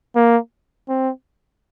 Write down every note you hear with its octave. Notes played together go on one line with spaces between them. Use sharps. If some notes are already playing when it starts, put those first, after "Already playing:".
A#3
C4